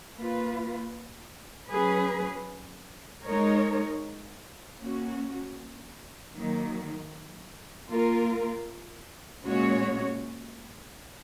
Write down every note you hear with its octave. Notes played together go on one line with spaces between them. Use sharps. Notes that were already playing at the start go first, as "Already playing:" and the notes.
A#3 F4 B4
F#3 C#4 G#4 B4
G#3 D#4 A#4 C#5
A#3 C#4 F#4
D#3 F#3 A#3
A#3 F4 A#4
A#2 G#3 C#4 F#4 C#5